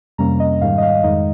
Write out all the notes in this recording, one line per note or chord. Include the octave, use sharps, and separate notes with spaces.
F2 C3 G3 A#3 C#4 A#5
D#5
G#2 D#3 G3 F5
D#5
F5
F2 D#3 G#3 D#4 D#5